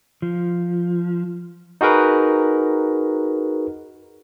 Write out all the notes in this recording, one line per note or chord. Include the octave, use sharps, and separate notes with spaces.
F3
D#4 F#4 G#4 A#4 B4